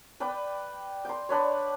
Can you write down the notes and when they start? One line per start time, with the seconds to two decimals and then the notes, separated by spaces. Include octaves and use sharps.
0.20 B4 D5 G5
1.05 G5 C6
1.29 D4 B4 C#5